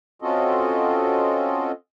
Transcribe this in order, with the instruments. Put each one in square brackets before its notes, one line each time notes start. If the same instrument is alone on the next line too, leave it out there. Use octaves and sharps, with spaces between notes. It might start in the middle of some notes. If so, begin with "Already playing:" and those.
[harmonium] C4 C#4 F4 F#4 A4 D#5